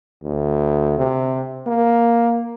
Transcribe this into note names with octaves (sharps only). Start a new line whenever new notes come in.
D2
C3
A#3